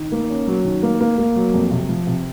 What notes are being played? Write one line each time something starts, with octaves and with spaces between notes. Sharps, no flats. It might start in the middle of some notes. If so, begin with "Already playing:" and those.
Already playing: D#3
A#3
C#4
F#3
D#3
A#3
A#3
A#3
F#3
F2
C3
F3
C3